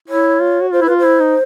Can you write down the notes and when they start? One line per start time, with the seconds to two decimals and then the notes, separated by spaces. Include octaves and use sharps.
0.08 E4 C#5
0.40 F4
0.61 F#4
0.72 F4 C5
0.81 E4
0.86 F4 B4
0.98 C5
1.05 E4
1.20 D#4